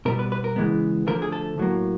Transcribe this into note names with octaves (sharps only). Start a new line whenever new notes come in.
B2 G3 B3 A#4
B4
B4
A#4
C#3 E3 G#3 B3
D3 F3 A3 A#4
G#4
A4
A2 F#3 A#3